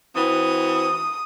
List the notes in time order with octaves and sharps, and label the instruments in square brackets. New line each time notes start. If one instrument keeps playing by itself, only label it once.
[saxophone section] E3 C4 F#4 [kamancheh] D#6